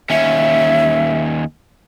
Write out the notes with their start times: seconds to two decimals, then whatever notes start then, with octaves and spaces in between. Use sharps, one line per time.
0.10 D#2 C#4 E5